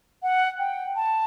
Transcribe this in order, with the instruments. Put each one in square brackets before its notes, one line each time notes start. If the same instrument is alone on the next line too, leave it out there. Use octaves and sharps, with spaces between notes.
[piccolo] F#5
G5
A5